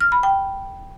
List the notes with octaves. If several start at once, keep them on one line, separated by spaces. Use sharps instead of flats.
F6
B5
G5